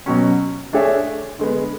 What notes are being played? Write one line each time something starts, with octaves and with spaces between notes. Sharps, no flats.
B2 F#3 C#4
A3 D4 G#4 C#5 E5
D3 G#3 B3